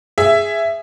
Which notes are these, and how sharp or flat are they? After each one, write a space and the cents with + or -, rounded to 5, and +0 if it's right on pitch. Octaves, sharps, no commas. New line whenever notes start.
G#4 +0 E5 +10